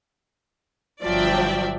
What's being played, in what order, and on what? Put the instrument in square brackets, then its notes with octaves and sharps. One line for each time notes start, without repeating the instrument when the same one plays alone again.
[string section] G1 D5 E5 [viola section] F3 F#3 G5